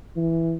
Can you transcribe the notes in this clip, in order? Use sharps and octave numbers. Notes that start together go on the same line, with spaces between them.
E3